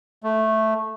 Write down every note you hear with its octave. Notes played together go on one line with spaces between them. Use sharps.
A3